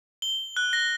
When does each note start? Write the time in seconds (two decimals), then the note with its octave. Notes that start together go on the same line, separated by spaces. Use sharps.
0.22 G7
0.57 F#6
0.73 A#6